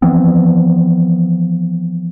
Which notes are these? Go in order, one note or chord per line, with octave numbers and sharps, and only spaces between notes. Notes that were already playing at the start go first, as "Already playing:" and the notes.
E3 F3 B3 C4